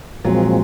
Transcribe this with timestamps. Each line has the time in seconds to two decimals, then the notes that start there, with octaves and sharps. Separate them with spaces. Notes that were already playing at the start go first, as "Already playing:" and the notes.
0.25 A#2 F3 F#3 G#3 C4